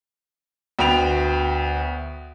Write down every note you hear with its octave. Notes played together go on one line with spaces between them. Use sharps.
D2 B3 G5 F7